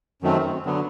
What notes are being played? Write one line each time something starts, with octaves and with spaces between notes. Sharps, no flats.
F#2 D#3 F#3 A3 C4
D3 F#3 B3